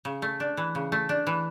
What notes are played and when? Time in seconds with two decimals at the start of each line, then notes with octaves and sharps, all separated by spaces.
0.05 C#3
0.22 A3
0.40 D4
0.57 E3
0.75 C#3
0.92 A3
1.09 D4
1.27 E3